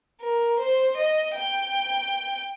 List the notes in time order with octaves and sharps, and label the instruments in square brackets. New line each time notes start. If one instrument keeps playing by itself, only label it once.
[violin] A#4
C5
D#5
G5